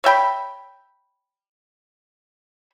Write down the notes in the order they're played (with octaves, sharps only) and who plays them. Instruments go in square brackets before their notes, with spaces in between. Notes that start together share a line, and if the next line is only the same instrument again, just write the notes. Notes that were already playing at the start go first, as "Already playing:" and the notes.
[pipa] C#5 E5 G5 B5